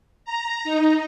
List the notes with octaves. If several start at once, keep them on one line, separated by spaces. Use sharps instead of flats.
A#5
D#4